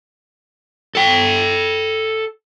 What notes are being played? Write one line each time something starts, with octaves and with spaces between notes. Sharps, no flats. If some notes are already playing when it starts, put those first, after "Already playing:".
A4 G5